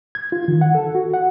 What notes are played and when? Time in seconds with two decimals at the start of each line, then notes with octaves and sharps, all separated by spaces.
0.15 G#6
0.32 F4
0.48 D#3
0.61 F#5
0.75 A4
0.95 F#4
1.14 F#5